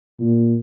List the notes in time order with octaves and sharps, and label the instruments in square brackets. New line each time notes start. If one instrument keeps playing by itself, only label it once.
[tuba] A#2